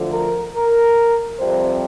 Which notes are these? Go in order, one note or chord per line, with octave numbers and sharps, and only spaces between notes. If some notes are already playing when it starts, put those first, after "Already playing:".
Already playing: D2 D3 F3 A3
A#4
A#4
F2 C3 G3 C4 C5